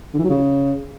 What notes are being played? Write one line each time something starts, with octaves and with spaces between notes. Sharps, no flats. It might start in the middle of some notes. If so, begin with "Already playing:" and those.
D3
E3
F#3
C#3